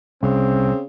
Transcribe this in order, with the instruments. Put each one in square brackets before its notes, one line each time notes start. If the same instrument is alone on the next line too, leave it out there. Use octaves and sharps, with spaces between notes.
[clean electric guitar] C2 [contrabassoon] C#3 [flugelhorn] C4